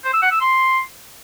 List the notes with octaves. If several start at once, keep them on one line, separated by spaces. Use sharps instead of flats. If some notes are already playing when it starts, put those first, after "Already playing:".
C5
E6
F#5
E6
C6